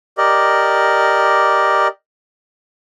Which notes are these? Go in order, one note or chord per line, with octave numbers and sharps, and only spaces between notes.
G4 A#4 D5 D#5